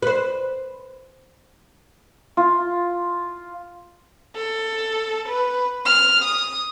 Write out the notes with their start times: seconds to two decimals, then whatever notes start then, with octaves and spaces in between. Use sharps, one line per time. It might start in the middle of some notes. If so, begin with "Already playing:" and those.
0.02 B4 C5
2.37 F4
4.36 A4
5.28 B4
5.86 F6
6.24 D#6